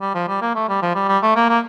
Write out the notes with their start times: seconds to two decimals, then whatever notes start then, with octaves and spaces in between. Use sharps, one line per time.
0.01 G3
0.15 F3
0.28 G3
0.42 A#3
0.55 A3
0.69 G3
0.82 F3
0.95 G3
1.08 G3
1.23 A3
1.36 A#3
1.49 A#3